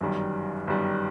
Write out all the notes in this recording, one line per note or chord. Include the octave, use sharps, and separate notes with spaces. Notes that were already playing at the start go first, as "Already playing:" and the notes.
G1 F#2 D#3 G3
G1 F#2 D#3 G3